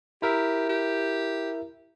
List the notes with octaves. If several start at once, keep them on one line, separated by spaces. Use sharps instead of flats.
E4 G4 A#4 E5
G4